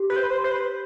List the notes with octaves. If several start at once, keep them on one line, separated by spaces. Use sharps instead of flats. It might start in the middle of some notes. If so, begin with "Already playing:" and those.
Already playing: G4
B4
C5
B4
C5
C5
B4